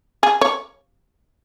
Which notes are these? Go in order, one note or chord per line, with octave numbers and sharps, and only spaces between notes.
G#4
C#5